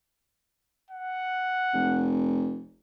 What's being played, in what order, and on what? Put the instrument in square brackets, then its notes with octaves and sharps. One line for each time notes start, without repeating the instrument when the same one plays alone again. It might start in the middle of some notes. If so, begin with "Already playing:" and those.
[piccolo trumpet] F#5
[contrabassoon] F1